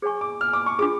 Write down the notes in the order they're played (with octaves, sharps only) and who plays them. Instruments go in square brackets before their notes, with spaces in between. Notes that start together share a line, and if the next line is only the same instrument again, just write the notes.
[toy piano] G#4 C#5 G#5 C#6
[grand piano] D6
F6
D6
C#6
[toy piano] D4 F4 G#4 [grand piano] D6